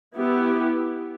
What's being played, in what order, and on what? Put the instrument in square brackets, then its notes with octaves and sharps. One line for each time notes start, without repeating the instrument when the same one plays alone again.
[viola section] B3 E4 G4